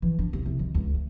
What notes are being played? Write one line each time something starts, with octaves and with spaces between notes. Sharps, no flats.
E3
D4
C2
C2
D#3
C#2
A3